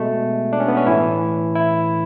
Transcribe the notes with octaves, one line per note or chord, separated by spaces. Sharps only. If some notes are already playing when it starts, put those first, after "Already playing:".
Already playing: B2 G#3 A3
D4
C#4
B3
C#4
A2 E3 E4
E4